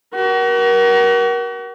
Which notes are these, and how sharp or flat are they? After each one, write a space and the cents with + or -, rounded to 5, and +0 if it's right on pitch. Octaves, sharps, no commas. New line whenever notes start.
F#4 +40 A#4 +30